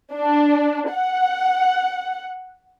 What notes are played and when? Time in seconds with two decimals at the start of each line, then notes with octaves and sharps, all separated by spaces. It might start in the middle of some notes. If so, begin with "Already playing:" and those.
0.15 D4
0.93 F#5